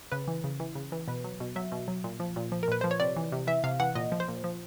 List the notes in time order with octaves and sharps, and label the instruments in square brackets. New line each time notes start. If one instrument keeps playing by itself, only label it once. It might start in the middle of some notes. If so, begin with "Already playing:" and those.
[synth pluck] C#3 B4
E3
C#3
E3
C#3
E3
B2 B4
F#3
B2
F#3 E5
B2
F#3
A#2
F3
A#2
F3
A#4
A#2 B4
F3 C5
C#5
C3 D5
E3
C3
E3 E5
C3 F5
E3 F#5
A#2 D#5
F3
C5
A#2
F3